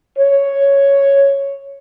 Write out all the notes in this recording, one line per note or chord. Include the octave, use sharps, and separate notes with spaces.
C#5